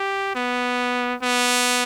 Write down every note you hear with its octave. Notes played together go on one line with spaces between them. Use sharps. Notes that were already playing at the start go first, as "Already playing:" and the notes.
Already playing: G4
B3
B3